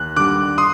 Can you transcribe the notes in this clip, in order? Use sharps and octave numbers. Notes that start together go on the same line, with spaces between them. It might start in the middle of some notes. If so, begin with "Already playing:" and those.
Already playing: D#2 F#6
D3 G3 D6 F#6
C6 D#6